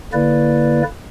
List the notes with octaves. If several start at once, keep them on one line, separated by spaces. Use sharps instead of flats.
D3 A#3 E4 B4 D5